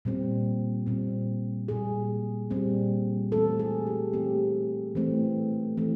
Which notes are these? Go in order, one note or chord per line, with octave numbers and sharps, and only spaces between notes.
A#2 G3 C4
A#2 G3 C4
A#2 G3 C4 G#4
A#2 G3 C4
E3 A3 C4 A4
G#4
G4
E3 A3 C4 G4
E3 A3 C4
E3 A3 C4